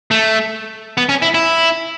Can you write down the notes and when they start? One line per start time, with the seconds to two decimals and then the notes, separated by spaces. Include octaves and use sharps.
0.11 A3
0.98 B3
1.09 C#4
1.22 E4
1.35 E4